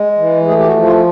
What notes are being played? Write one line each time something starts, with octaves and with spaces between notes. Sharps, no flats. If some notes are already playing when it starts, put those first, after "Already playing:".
Already playing: G#3
E3
A3 G#4
G4
F#4
F3
F4